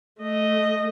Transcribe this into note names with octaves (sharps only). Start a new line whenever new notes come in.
A3 D#5